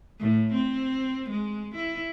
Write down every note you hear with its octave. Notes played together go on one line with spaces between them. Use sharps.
A2
C4
G#3
E4